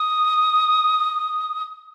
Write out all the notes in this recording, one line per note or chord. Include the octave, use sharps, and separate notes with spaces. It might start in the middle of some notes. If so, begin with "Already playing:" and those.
Already playing: D#6